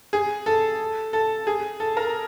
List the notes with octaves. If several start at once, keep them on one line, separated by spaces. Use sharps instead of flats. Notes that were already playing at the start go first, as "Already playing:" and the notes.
G#4
A4
A4
G#4
A4
A#4